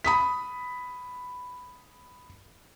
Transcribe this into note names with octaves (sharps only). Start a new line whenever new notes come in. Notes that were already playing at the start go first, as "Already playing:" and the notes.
B5 D#6 B6